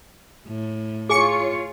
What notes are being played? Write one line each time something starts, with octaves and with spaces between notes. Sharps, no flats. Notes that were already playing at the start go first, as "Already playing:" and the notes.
A2
F4 G#4 C#5 G#5 C#6 C#7